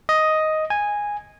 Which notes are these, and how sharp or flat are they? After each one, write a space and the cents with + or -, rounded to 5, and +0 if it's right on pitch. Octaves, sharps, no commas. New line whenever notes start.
D#5 +5
G#5 -10